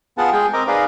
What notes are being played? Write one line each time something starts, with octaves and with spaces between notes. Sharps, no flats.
B3 F4 G#4 F#5 A5
G#3 G#4 G5
C4 A#4 D#5 A#5 D6
D#4 G#4 B4 D5 D#5 F5